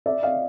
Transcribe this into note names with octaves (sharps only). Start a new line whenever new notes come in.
D5 E5
D#5 F5